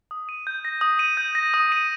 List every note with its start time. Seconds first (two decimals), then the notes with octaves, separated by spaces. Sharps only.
0.11 D#6
0.29 D#7
0.47 G6
0.65 A#6
0.81 D#6
0.99 D#7
1.17 G6
1.35 A#6
1.54 D#6
1.72 D#7